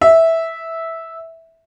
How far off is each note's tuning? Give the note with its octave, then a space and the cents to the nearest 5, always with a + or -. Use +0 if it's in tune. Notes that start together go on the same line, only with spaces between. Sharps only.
E5 -10